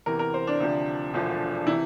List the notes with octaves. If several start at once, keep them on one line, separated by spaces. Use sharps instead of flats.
E2 C3 E3 A#4
A#4
C5
D4
D2 C3 F3
E1 D2 D3 F3
C3 E3 E4